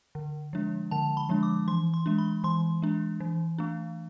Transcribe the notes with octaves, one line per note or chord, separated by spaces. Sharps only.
D3
F3 G#3 D4
D3 A5
B5
F3 G#3 D4
D6
E3 C6
C6
G#3 D4
B5
E3 C6
G#3 D4
E3
A3 D4